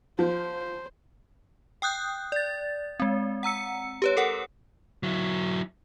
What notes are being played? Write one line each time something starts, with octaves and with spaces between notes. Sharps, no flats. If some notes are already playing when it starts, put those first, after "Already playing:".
F3 C5
G5 D#6 F#6 G6
D5 A6
G#3 C4
F#5 A#5 E6 C#7
G4 B4 C#5
A4 A#4 F#5
F#3 E4